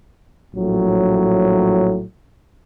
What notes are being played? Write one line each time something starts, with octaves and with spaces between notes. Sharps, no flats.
A#1 A2 F#3